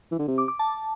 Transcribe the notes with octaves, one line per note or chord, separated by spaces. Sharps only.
E3
D3
C3
D6
D6
A5